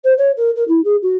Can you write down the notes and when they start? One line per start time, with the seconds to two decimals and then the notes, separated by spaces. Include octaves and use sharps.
0.04 C5
0.18 C#5
0.36 A#4
0.56 A#4
0.68 E4
0.84 G#4
1.02 F#4